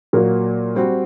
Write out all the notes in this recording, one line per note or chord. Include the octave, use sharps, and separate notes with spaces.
A#2 F#3 A#3 F#4
G3 C4 F#4